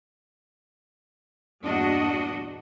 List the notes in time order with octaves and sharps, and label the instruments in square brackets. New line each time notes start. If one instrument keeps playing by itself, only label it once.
[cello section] E2 G2 A#2 D4 F#4 D#5